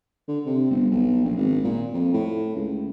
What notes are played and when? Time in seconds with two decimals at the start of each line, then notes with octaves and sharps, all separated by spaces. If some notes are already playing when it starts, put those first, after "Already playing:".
0.28 D3
0.46 C3
0.70 G1
0.91 B1
1.25 A#1
1.37 G#1
1.64 A#2
1.94 F2
2.14 A2
2.55 C#2